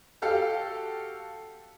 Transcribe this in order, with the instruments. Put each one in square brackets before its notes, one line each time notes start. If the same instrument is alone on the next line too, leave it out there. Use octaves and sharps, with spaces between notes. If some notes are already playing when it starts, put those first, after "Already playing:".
[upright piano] F#4 G4 A4 F5